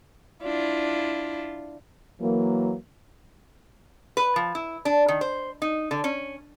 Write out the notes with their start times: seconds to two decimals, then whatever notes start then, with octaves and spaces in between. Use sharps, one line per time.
0.44 D4 E4 F4
2.21 E3 F#3 A#3
4.17 B4
4.36 F3
4.55 E4
4.85 D4
5.08 D#3
5.21 C5
5.62 D#4
5.91 D3
6.04 C#4